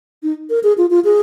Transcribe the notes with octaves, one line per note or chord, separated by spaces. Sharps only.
D#4
A#4
G#4
F4
F4
G#4